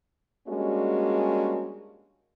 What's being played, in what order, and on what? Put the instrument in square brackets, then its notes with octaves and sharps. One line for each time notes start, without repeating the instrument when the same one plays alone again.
[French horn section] G3 G#3 A#3 C#4 D4 F#4